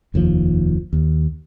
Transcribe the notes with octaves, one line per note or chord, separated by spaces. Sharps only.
F1 D#2 C3 F3
D#2